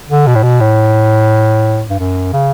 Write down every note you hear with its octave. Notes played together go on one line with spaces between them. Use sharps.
D3
B2
A2
B2
A2
G2
F#2
C#3